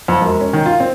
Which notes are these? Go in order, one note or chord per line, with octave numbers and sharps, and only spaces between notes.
F2
E1
C#4
D#3
F4
C4